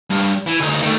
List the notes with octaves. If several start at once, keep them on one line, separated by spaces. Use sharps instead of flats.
G2
E3
D2 D#4
D#3 A3